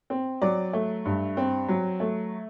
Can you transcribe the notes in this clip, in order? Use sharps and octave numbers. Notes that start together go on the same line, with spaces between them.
C4
F#3 D5
A3
G2
C4
F#3
A3